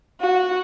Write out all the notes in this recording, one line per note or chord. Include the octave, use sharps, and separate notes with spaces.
F#4